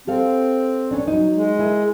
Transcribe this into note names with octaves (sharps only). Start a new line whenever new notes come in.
C4 G4 A4 F5
B3 C#4 D4
F#3 D#4
G#3
E4 G#4 A#4